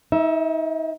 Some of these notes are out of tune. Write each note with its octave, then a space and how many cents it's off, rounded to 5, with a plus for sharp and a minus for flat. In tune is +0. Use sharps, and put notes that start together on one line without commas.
D#4 +35 E5 +0